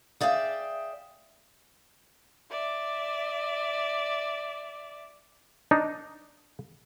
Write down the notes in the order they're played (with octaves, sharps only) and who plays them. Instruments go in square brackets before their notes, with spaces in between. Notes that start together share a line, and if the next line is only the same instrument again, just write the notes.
[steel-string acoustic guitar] G#4 D5 E5 F5 G5
[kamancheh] D5 E5
[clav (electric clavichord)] D4 D#4